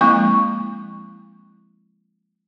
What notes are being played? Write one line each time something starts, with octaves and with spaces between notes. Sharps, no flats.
F3 G#3 A#3 C4 E4 C#6